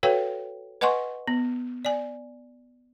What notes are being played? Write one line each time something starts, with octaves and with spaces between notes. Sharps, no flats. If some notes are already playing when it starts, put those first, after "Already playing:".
F#4 A4 B4 C#5 F5 G5
B4 D#5 F#5 G#5 C6 C#6
B3
D5 G#5